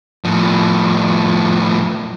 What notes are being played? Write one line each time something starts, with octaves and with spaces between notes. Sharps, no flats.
A2 F3